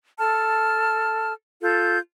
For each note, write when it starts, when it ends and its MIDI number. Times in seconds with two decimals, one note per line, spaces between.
0.18 1.33 69
0.18 1.33 81
0.18 1.33 89
1.62 1.99 65
1.62 1.99 69
1.62 1.99 91